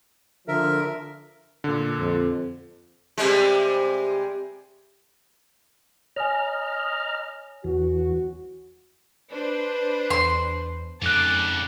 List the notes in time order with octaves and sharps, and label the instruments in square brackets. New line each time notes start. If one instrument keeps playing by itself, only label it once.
[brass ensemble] D3 F3 [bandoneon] A#4 E5
[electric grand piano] A#2 D3
[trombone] F2
[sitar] C3 G3 G#3
[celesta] C#5 G#5 [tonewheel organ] D#5 A#5 F6
[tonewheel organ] E2 E3 [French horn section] F#4
[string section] D4 B4 C5
[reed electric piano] E2 [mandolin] C6
[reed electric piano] F2 F#6 [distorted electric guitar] G#2 C#3 [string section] A5 D6